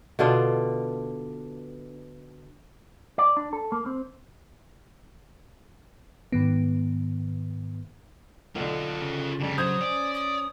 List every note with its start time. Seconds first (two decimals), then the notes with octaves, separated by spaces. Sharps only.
0.19 B2 D3 D4 F4
3.18 D5
3.37 D4
3.53 A4
3.72 A#3
3.86 C4
6.32 G#2 D#3 B3
8.56 B1 D3 F4 A4
9.02 C#3
9.40 F2 D3 G3 D4
9.58 F#3 C5 D#6 G6 G#6
9.81 C#4 D5
10.14 D#6